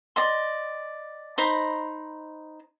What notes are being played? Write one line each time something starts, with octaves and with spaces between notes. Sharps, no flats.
D5 D#5 C6
D#4 C5 A#5 B5